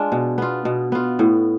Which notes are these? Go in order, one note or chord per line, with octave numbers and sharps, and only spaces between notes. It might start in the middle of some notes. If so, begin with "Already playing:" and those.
Already playing: G#3 D4 F4
B2
B3 F4
B2
B3 F4
A2